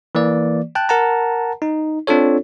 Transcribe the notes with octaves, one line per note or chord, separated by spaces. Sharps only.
E3 A#3 D5
G5 A5 F#6
A#4 F#5 A5 A#5
D#4
C4 D4 F4 A4 C#5